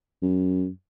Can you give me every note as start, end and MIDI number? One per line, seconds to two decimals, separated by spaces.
0.22 0.69 42